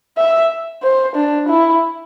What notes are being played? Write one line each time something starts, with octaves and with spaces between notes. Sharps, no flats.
E5
C5
D4
E4